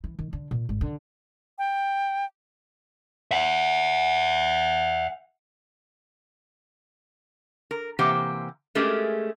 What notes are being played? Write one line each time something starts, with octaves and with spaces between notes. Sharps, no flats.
E3
D#3
D3
A#2
G#1
D3
G5
E5 F#5
A#4
C3 E3 A#3 G4 C5 F#5
G#3 A3 C#4 G4 G#4 A#4